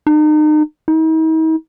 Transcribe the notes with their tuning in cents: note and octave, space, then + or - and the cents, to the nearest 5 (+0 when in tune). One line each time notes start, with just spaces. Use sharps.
D#4 -35
D#4 +45